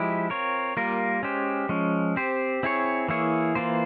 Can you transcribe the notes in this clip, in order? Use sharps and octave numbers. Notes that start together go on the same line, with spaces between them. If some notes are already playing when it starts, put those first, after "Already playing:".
Already playing: F3 G#3 E4 G4
C4 F4 A#4 C#5
G3 A#3 F4 A#4
G#3 C#4 G4 C5
F3 G#3 C#4
C4 G4 C5
C4 E4 G#4 C#5
E3 A#3 E4 G#4 C#5
E3 A#3 F4 C5